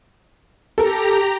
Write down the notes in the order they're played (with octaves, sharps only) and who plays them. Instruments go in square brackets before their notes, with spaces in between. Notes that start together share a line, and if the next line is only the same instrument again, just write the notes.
[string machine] G4 A#5 [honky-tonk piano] A4 A#4